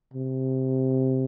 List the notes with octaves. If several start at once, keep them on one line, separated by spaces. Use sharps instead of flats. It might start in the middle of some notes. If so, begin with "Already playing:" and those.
C3